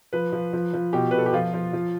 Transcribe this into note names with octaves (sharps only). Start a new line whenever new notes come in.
F3 B4
F3
F3
F3
B2 G4
B2 B4
A4
G4
F3 F4
F3
F3